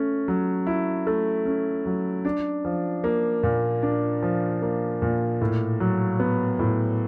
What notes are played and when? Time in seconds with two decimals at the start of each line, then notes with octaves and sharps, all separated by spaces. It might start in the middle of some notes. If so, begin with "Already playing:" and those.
Already playing: A3 C#4
0.28 F#3
0.67 E4
1.07 A3
1.45 C#4
1.86 F#3
2.25 D4
2.65 F3
3.04 A#3
3.43 A#2
3.82 D4
4.22 F3
4.62 A#3
5.02 A#2
5.41 A2
5.80 F#3
6.19 B3
6.59 A2